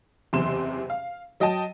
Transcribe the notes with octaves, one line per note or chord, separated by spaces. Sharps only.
F#1 E2 C3 C6 E7
F5
F#3 D#5 G5 A5 D#7